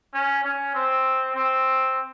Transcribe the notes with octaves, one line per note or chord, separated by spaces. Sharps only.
C#4
C#4
C4
C4